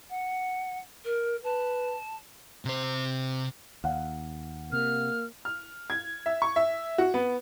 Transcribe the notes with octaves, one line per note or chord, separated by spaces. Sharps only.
F#5
A#4
B4 A5
C3 C5
D#2 F5 F#5
C3 A#3 F6
F6
G#6
E5
C#6
E5
F#4
B3